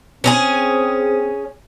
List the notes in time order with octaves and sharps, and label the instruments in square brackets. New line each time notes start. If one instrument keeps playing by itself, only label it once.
[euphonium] C4 [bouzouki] C#4 D#4 G#4